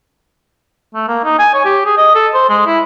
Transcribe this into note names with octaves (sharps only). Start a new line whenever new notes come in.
A3
A#3
D#4
G#5
C#5
G4
G#4
D#5
A4
C5
G#3
E4